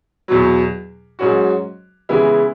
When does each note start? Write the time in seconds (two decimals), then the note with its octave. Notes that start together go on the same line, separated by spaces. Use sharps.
0.28 E2 B2 F#3
1.19 G#2 F#3 C#4 F#4
2.09 C#3 E3 G#3 B3 E4